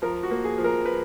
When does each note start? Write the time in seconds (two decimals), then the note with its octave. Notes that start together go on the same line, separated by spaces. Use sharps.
0.02 F3 A#4
0.23 F#4
0.31 A#3
0.44 G#4
0.58 F3
0.64 A#4
0.85 B4